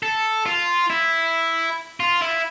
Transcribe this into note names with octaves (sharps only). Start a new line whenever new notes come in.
A4
F4
E4
F4
E4